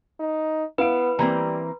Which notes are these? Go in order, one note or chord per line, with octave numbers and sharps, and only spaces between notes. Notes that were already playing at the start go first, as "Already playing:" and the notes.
D#4
B3 E4 B4 F5 D7
E3 G3 A#3 C4 A#5